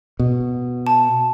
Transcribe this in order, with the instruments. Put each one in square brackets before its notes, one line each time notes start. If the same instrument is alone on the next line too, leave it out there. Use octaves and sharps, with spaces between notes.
[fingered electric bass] B2
[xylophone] A5